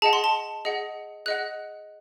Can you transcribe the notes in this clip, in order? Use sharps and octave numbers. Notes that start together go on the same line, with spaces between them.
G#4 D#5 F#5 A5
C6
A5
G#4 D#5 F#5
G#4 D#5 F#5 F#6